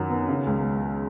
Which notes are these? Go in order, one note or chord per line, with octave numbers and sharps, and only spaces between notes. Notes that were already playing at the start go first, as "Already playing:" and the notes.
Already playing: F#2 D#3 F#3
B3
C#3
C#2